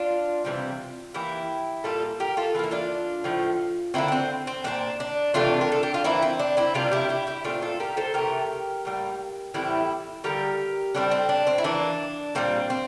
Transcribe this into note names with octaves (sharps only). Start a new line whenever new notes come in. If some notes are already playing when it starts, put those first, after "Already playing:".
Already playing: D4 F4
C3 E3 G3 C4
E3 A#3 E4 G4
A#2 G3 A#3 F4 A4
G4 A#4
F4 A4
E3 A#3 E4 F4
D4 F4
A2 F3 A3 C4
D3 F3 A#3 C4 E4
D4
C4
C4
A#2 A3 C4 D4
D4
C3 E3 A3 C4 D4 F4
A#4
A4
G4
F4
E3 A#3 C4 E4
C4
D4
C4 E4
C3 G3 A#3 D4 F4
E4 G4
E4 G4
E4 G4
A#2 A3 C4 D4 F4
F4 A4
G4 A#4
A4 C5
C3 E3 A3 G4 A#4
A2 G3 A#3
A2 E3 G3 C4 E4 G4
D3 G3 A#3 G4 A#4
A2 G3 C4 D4
C4
D4
C4
E4
E3 A#3 D4
A#2 G3 A#3 C4
C4